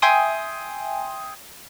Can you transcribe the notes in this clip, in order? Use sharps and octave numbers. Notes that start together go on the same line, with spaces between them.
E5 G5 G#5 C6 D#6